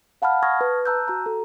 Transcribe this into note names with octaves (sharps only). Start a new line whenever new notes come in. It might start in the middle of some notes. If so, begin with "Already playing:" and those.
F5 F#5 A5 B5 F6
A5 C#6 D#6 F6 G#6 A#6
B4
A5 A#5 E6 F#6 G6
F#4 A#5
A4